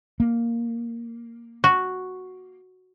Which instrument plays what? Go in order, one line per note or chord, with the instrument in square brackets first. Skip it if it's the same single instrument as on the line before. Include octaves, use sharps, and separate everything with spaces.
[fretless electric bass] A#3
[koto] F#4